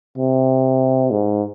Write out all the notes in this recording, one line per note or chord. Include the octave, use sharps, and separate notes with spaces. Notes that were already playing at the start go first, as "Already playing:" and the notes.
C3
G#2